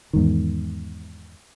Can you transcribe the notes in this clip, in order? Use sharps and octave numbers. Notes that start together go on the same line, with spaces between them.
E2 G#2 D#3